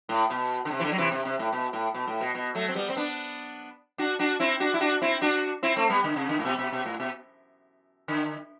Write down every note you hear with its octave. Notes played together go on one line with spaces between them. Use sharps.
A2
B2
D3
C3
E3
D3
F#3
C3 E3
C3
C3
A2
B2
A2
B2
A2
B2
B2
F#3 A3
C4
G3 B3
C4
B3 D4
D4 F#4
D4 F#4
C4 E4
D4 F#4
E4
D4 F#4
C4 E4
D4 F#4
C4 E4
A3 C4
G3 B3
D3
C3
D3
A2
B2
B2
B2
A2
B2
D3